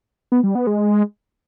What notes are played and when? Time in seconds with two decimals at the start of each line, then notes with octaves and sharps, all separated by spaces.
0.32 B3
0.43 G3
0.55 B3
0.67 G#3